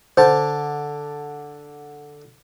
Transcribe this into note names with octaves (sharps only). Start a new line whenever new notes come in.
D3 C5 A5